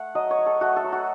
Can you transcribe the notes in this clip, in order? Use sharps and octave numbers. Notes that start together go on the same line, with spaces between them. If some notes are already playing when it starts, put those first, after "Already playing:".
Already playing: A3 F#5
F#3 D#5
C#5
F#3
A4
A3 F#4
A4
F#3
F#4